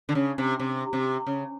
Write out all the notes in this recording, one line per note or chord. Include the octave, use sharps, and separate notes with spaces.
D3
C#3
C3
C3
C3
C#3